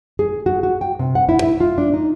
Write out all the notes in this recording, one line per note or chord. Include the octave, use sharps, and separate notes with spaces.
G#4
F#4
F#4
G5
C3
F#5
E4
E5
F4
D4
D#4